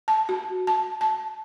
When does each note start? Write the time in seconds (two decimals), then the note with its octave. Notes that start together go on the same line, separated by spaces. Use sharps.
0.08 A5
0.29 F#4
0.67 A5
1.01 A5